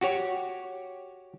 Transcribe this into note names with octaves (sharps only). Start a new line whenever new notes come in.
F#4 G4 C#5